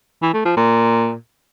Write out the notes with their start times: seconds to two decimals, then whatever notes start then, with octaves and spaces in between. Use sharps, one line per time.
0.22 E3
0.34 A3
0.45 F3
0.57 A#2